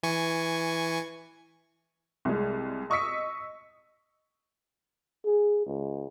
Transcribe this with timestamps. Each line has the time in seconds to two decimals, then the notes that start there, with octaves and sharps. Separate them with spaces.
0.03 E3 G#5 C#6
2.25 C2 G#3
2.90 D#5 C#6 D#6 E6 B6 C#7
5.26 G#4
5.67 C#2